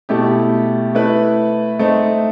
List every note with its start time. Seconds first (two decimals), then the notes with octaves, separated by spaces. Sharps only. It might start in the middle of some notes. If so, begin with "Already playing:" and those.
0.09 B2 A3 E4 G4
0.95 A3 E4 B4
1.79 A3 C4 D#4